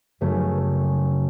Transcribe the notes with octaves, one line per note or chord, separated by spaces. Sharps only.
F#2 C#3 A3